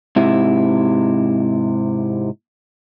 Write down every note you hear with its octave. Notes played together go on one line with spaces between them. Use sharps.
G#2 C3 E4